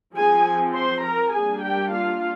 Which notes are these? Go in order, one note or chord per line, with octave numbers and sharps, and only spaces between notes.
F3 C4 G#4 G#5
C5 C6
A#4 A#5
G3 A#3 D4 G#4 G#5
G4 G5
F4 F5